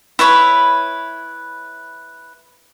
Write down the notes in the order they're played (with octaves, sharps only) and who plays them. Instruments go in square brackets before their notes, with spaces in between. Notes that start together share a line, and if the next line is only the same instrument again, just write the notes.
[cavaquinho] E4 B4 C#5 B5